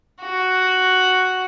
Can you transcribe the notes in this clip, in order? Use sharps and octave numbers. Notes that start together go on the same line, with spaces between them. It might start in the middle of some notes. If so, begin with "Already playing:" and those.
F#4